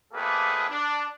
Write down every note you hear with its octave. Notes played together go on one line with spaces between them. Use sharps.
F2 A3 A#3 G4 G#4 B4
D4